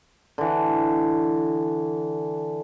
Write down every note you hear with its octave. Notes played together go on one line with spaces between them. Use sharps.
D3 E3